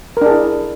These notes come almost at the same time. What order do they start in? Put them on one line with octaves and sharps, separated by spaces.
A#4 D4 G#4 E4